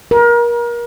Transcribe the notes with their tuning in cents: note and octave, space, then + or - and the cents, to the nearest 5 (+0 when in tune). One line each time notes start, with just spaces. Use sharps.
A#4 +30